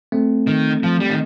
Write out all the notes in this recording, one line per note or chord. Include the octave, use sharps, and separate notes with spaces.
A3 C4
D#3
F3
G3
D#3